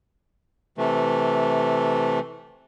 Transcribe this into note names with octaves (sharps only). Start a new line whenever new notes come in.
C3 E3 A3